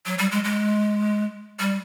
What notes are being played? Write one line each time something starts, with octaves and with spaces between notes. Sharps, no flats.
F#3
G3
G#3
G#3
G3